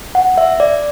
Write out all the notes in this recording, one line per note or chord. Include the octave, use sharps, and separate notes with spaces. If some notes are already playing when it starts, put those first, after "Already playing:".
F#5
E5
D5